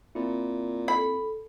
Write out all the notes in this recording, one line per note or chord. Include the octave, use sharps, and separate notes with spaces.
A#2 C4 E4
A4 B5